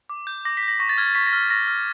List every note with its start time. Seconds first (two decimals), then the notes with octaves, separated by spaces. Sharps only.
0.09 D6
0.27 G6
0.45 D6 A#6
0.57 B6
0.63 G6
0.68 A#6
0.80 C#6 A#6
0.89 A6
0.98 F6 G#6
1.06 A6
1.15 C#6 B6
1.27 A#6
1.33 F6
1.38 A6
1.50 C#6 A#6
1.68 F6